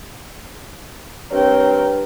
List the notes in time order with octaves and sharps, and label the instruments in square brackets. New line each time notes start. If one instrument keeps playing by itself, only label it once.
[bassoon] G2 [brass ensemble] C4 C#5 [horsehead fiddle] A#4 G5